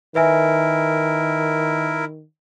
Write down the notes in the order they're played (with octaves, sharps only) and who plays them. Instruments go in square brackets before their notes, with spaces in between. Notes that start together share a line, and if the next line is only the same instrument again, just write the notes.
[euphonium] D#3 [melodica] E4 A#4 [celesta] B4 E5 G#5